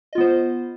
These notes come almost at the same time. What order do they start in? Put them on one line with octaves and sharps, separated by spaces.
D#5 F4 B3 C5